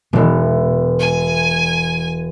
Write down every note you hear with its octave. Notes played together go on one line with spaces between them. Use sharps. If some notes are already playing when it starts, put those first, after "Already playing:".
E1 B2 E3
G#5